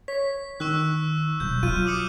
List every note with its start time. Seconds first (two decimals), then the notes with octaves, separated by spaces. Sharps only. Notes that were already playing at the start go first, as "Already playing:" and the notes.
0.08 C#5 B6
0.60 D#3 C#6 E6 F#6
1.40 B2 F#3 G6
1.63 F#3 F4 F6 D#7
1.85 D6 D#6 C#7